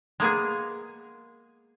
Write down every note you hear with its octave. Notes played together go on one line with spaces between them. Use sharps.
G#3 A#3 B3 G#4